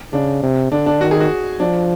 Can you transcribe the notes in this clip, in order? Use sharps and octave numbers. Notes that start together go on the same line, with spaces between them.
C#3 D4
C3
D3 D4
D4
D#3 F#4
G#4
F#4
F3 D4